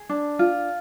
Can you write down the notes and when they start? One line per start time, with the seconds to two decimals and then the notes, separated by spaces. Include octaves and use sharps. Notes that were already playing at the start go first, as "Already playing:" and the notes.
Already playing: G#4
0.09 D4
0.39 F4